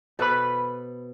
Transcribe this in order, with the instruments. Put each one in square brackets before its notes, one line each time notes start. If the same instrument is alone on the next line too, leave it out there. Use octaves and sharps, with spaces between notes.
[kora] B2 A4 C5 [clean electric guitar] B4 B5